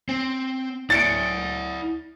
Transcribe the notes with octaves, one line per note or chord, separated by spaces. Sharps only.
C4
E4 D5 A6 C#7 D7